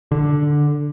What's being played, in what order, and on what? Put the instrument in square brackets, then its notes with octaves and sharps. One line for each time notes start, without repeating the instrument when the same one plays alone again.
[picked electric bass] D3